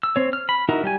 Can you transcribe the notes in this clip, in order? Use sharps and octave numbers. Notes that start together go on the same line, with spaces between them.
E6
C4 C#5
F6
B5
D#4 E4 F#4 A#4
G3 G4 G#5